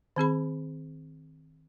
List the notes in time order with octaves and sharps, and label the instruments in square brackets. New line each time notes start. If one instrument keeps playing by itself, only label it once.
[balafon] D#3 C4 G#4 B5